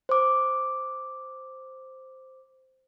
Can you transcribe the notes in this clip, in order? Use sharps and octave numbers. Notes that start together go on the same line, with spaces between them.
C5 D6